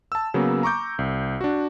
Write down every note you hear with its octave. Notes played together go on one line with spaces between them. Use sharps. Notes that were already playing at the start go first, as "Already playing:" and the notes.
A5 E6
C#3 F#3 A#3 B3
A#5 C#6 D6 G6
C2
D4 F#4